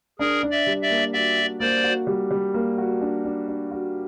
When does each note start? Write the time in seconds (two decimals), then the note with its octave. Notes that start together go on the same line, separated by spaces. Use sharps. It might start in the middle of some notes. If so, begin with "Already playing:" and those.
0.19 D4 G#4 A#4
0.43 D4
0.51 D5 E5
0.66 G3
0.82 D5 E5
0.90 A#3
1.13 F#4 D5 E5
1.38 F#4
1.60 A#3 C5 D5
1.84 F#4
2.07 G3
2.31 G3
2.54 A#3
2.78 F#4
3.01 D4
3.25 D4
3.48 D4
3.71 F#4